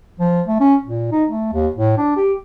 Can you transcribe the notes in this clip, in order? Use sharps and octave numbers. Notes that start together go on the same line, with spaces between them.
F3
A3
C#4
A#2
D#4
A3
D#2
A2
D4
G4